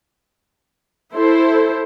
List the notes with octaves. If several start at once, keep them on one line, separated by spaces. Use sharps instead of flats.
E4 A4 C5